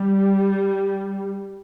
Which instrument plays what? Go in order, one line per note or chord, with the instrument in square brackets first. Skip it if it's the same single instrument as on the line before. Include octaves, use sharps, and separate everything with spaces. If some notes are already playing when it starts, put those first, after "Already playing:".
Already playing: [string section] G3